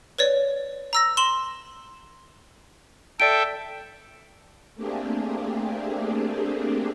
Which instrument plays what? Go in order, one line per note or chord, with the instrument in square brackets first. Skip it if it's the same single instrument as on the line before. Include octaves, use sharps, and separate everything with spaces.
[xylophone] B4 C#5 D5
A#5 E6 A#6
C6 E7 F#7
[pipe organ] A4 E5 G5 [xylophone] D5 D7
[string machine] A3 A#3 C4 D4 G4 G#4